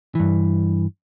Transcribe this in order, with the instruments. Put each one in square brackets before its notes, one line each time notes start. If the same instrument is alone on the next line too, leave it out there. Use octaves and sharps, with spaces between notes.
[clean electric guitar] G2 E3